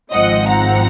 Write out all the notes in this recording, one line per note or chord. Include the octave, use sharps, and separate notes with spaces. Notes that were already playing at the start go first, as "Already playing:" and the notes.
G#1 G#2 F3 C4 D#5 F#5
F#5 A#5